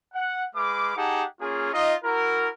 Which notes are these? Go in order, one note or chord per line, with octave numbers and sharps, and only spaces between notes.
F#5
G#3 B4 F5 D6
D#4 G4 G#4 F#5 A5
A#3 C#4 F4 G#4
D#4 F4 D#5
E4 F#4 A#4